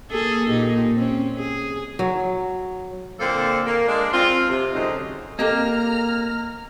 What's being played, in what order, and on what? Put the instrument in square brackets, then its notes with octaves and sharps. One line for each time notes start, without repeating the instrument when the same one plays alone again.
[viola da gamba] A#3 G#4 A4
A#2 D#4 G4
C4 C#4
G#4
[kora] F#3
[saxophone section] A#2 D3 A#3 C4 A4
A#3
G#3 D4
C4 F4
C3
D3 F#3 G#3 C4 C#4 D#4
[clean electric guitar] A#3 [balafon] C4 A4 [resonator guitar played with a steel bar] G4 D#5 [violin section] A#5 F6